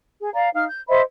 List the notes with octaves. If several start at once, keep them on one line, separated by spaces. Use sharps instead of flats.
G#4
D5 F5 A#5
D#4 F5 F6
G6
C5 D#5 E5 B5